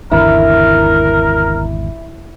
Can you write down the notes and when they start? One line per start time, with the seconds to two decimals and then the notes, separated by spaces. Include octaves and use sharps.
0.12 G#1 E2 D3 E4 A#4